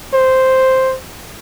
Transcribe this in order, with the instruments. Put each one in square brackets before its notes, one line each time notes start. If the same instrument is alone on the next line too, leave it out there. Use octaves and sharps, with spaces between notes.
[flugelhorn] C5